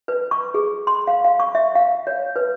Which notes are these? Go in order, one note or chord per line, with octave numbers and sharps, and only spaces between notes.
B4
C#6
G#4
C6
F5
F5
C#6
E5
F5
C#5
B4